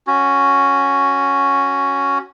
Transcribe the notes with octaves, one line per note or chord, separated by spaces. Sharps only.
C#4 F#4